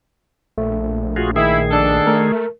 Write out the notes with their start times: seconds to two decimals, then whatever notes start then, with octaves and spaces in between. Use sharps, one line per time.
0.58 A#1 A3
1.16 F4 F#4 G#4
1.36 D#3 E4 G#4
1.71 D4 A4
2.07 A3 A#4